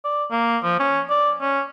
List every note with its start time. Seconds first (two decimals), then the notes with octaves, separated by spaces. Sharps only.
0.04 D5
0.31 A#3
0.64 F3
0.80 C#4
1.10 D5
1.41 C#4